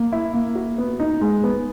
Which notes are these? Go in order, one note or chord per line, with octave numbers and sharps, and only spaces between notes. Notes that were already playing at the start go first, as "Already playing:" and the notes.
Already playing: A#3
E4
A#3
F#4
B3
D#4
G#3
B3